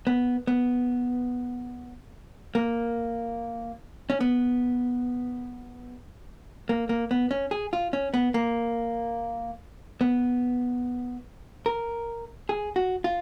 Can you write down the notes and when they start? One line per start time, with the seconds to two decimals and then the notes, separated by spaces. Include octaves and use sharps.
0.07 B3
0.47 B3
2.55 A#3
4.10 C#4
4.21 B3
6.69 A#3
6.89 A#3
7.11 B3
7.31 C#4
7.51 G#4
7.73 F4
7.93 C#4
8.14 B3
8.34 A#3
10.01 B3
11.66 A#4
12.49 G#4
12.76 F#4
13.04 F4